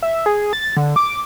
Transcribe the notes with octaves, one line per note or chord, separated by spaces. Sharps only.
E5
G#4
A6
D3
D6